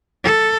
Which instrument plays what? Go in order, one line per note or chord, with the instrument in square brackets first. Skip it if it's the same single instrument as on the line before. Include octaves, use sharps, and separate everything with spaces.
[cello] A4